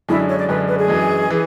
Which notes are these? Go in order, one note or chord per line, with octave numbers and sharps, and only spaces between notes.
F#2 D3 G#3 D4 E4
C#5
D5
F#2 D3 G#3 D4 B4
B4
G#4
F#2 E3 G#3
E3